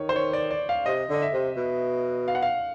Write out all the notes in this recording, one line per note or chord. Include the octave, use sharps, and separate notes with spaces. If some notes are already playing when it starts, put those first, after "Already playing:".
Already playing: D#3 C#5
C5
C#5
D5
D5
F5
C3 D#5
D3 D#5
E5
C3
B2
F5
F#5
F5